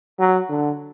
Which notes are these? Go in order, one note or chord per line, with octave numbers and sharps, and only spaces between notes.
F#3
D3